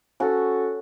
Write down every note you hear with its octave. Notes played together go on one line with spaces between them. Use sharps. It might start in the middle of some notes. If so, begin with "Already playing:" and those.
C#4 F#4 A4